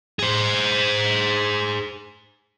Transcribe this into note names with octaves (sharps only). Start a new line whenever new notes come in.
G#4 C5